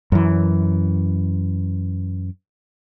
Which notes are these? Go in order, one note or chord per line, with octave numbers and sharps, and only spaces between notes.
F#2 E3